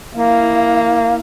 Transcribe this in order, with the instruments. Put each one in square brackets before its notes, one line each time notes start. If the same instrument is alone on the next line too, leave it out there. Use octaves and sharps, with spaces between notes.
[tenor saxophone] A#3 [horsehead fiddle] E4 F5